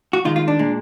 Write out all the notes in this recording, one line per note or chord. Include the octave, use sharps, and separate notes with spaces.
F#4
D#2 D#3 G#3 F4
F4
D4
A#2 G#3